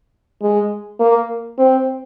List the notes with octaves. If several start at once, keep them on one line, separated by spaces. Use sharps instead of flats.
G#3
A#3
C4